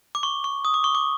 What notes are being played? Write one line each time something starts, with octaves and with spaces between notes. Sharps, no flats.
D6
C#6
C#6
D#6
D6
C#6
D6